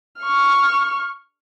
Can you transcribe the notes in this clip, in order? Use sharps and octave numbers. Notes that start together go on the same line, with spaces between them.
C#6 F6